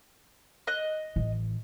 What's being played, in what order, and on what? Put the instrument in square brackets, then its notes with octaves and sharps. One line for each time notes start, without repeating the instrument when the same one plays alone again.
[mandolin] D#5 F#6
[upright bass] A1 E3